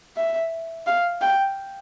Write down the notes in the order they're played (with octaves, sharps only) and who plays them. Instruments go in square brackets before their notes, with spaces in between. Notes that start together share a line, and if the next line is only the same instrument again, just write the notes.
[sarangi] E5
F5
G5